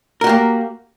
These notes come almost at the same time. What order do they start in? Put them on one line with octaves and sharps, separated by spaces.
A#4 F#4 G4 A#3